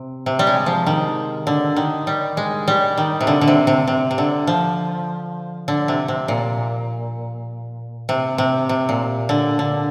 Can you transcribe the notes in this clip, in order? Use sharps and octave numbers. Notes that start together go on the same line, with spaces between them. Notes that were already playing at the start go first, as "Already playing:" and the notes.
Already playing: C3
C3
G3
G#3
F3
D#3
D3
D#3
G3
G#3
G3
D#3
C3
D3
D3
C3
C3
C3
C3
D3
F3
D3
C3
C3
A#2
C3
C3
C3
A#2
D3
D3